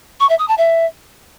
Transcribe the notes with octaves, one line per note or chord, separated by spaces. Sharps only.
C#6
E5
D#6
A5
E5